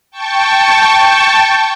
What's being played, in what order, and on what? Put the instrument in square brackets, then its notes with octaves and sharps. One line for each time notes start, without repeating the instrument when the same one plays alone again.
[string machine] G5 A5 C#6